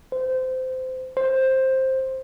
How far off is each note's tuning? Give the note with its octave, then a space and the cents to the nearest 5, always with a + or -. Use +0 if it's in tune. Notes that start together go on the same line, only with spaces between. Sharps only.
C5 -20
C5 +10